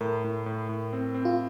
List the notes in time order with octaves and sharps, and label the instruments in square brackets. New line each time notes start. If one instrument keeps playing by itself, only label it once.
[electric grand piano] A2 [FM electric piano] A#4
[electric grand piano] A2
A2
A2
C4
C4
[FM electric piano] F4